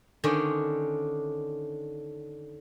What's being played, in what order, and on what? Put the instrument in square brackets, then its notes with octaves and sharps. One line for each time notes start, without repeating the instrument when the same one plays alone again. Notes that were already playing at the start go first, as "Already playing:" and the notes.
[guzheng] D3 D#3 C#4 D4 C5